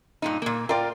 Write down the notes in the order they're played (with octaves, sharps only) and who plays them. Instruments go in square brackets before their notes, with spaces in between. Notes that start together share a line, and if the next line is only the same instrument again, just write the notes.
[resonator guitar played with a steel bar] G2 A#2 D#4
A#2 A#3
[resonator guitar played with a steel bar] F4 D5 [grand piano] A#4 G5